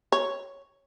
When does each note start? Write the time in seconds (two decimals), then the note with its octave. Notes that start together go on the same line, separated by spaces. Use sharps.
0.12 C#5